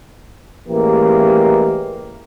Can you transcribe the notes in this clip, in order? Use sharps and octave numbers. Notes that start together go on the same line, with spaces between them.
A1 E3 G#3 A#3 G4